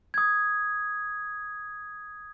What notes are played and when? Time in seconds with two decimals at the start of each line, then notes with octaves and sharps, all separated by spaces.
0.14 D#6 G#6